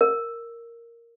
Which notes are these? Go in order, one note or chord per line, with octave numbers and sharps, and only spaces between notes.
A#4